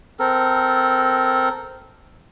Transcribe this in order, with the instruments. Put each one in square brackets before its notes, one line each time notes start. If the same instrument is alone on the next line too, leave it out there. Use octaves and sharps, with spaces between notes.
[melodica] C4 A4 A#4